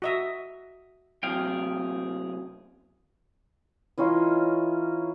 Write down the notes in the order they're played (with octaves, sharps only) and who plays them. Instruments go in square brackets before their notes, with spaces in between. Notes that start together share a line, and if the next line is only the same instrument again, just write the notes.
[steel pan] F#4 D#5 E5
[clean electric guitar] F#2 C3 F#3 [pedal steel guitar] G#4 F5 G5
[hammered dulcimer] E3 C#4 D#4 F4